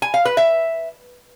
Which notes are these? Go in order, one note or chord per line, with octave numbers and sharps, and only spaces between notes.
G#5
F5
B4
E5